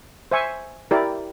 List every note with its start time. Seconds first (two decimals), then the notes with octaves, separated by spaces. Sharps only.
0.31 C5 E5 G#5 C#6
0.91 E4 G4 A#4 D5